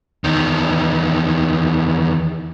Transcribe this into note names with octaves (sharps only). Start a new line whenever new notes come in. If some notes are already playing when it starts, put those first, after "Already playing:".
E2 D#3